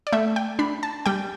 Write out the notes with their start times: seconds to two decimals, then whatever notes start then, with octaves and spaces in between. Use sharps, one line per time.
0.07 D5
0.13 A3 E5
0.36 G5
0.59 D4 B5
0.83 A5
1.06 G3 G5